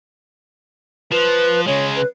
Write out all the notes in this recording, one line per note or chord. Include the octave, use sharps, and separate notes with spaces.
F3 B4
C#3 G#3 C#5
B4